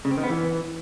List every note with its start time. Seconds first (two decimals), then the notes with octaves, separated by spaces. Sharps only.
0.05 C#3
0.11 C4
0.17 D#3
0.23 B3
0.30 E3